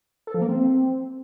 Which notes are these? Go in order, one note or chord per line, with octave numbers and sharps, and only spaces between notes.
A4
F3
A#3
C4